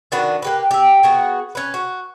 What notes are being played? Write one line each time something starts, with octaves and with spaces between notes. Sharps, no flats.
D#3 D4 F#4 B4
A#3 G4 B4
G4 E5
B3 F#4 G#4
C#4 B4
F#4